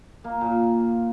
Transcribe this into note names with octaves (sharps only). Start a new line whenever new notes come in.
A#3
A#2